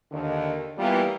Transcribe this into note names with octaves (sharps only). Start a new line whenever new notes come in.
D#2 D3 D#3
E3 G3 A#3 B3 F4